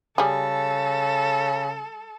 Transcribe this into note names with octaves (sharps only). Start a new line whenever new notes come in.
C#3 G3 G#4 A4